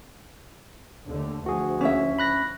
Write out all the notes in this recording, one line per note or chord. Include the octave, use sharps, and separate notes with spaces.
D#2 D3 A3
D2 F3 F#4 G#4
C#4 E4 E5
B5 F#6 A#6